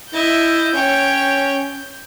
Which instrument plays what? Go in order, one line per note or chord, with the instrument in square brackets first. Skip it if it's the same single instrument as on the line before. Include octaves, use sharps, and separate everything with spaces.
[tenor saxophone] E4 [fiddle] D#5 E5 [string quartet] G6
[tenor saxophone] C#4 [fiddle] C#5 G5